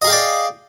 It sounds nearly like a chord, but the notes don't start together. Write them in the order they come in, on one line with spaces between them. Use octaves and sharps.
D#5 G#4 F5 G5 D5